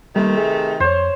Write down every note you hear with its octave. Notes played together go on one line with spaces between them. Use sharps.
C3 D#3 G3 A3 A#3
G#4
F2 C5 C#5